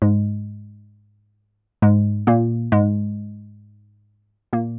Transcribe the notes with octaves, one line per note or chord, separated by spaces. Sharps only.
G#2 G#3
G#2 G#3
A#2 A#3
G#2 G#3
A#2 A#3